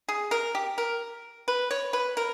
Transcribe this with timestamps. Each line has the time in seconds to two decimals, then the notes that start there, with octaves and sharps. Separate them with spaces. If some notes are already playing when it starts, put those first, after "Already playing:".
0.09 G#4
0.31 A#4
0.55 G4
0.78 A#4
1.48 B4
1.71 C#5
1.93 B4
2.17 A#4